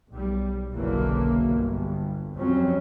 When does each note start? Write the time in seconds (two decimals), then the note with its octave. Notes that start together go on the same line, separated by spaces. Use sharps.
0.11 B1 G3
0.74 F#1 B1 D3 E3 F#3 A#3
1.48 G1
2.34 F2 F#3 G3 C4 C#4